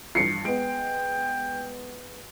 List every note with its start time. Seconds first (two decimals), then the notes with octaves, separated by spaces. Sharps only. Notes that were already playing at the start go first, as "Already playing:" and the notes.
0.15 G2 E3 F3 C7 C#7
0.45 G#3 B3 G5 D7